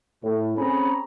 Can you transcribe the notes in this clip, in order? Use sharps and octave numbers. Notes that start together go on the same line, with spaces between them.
A2
C4 C#4 G#4 A#5 B5